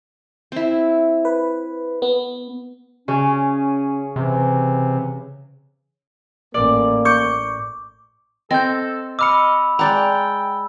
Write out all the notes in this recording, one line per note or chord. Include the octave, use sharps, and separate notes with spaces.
C4 E4
B4
B3
C#3 C#4
C3 E3
A1 A#3 D5
C#6 D6 G6
C4 A4 D#5 G6
D#5 B5 D6 E6 F6 C#7
G#3 D5 F#5 G5 A#5